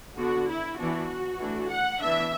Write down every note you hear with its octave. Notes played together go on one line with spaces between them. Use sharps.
D3 B3 D4 F#4
E4
E3 B3 D4 F#4
E3 A3 D4
F#5
E3 B3 D4 E5